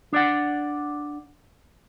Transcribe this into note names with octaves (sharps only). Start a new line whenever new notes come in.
D4 D5 F#5